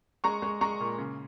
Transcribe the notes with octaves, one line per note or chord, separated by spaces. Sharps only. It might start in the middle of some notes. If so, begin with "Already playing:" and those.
G#3 A#5 C#6
G#3
G#3 A#5 C#6
A#2
C#3